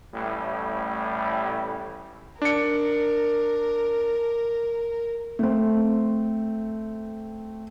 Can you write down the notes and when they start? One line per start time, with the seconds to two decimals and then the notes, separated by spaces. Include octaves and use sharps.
0.13 A1 A2 G3
2.42 D4 A#4 C#7
5.39 A3 C4